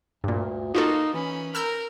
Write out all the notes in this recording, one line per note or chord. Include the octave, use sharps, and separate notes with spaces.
D2 G2 A#2
A#3 D#4 F4 F#4 A4
E3 C#4 B5
A#4 E6 F6 G6